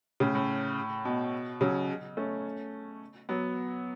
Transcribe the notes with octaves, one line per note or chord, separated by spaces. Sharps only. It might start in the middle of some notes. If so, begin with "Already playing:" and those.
A2 C#3
A2
B2
C#3 F#3
A3 C#4
F#3 B3